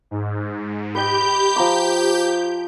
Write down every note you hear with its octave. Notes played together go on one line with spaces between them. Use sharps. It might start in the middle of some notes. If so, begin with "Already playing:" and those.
G#2
G4 B4 D#5 G6
F3 A#5 D6